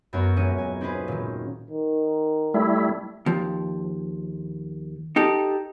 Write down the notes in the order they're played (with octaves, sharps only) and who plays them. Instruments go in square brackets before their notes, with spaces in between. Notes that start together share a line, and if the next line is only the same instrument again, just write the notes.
[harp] F#2 B3 F#4 A#4 C#5
D#1 G#3 C#4 F#4 C#7 D#7
G#5
C4 C#4 D#4 G#4 B4 C5
A#2 D#3
[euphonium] D#3
[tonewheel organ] G3 A3 E4
[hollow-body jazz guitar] D#2 F3
D#4 G4 A4